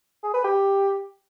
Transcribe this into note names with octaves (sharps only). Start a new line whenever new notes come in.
G#4
B4
G4